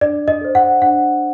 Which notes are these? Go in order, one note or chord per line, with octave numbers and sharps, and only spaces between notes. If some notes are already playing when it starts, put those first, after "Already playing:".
D4 D5
D#5
A4 C5
F#5
D4 F#5